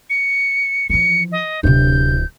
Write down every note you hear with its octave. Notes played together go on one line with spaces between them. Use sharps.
C#7
E3 F3 C#7
D#5
D1 C3 D4 G6